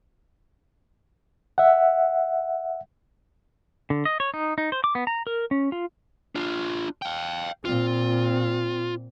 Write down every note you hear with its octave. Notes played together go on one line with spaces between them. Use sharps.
E5 F#5
D3
D#5
C#5
D#4
D#4
C5
D6
B3
A#5
A#4
C#4
F4
D4 F4
F5 G5
A#2 C4 F4